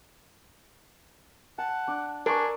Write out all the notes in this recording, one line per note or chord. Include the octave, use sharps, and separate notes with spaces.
F#5 A5
D4 D5
D4 A#4 D5 G#5 C#6 D6